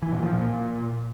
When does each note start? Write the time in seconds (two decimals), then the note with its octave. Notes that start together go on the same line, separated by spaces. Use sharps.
0.02 E3
0.13 A#2
0.23 F3
0.33 A#2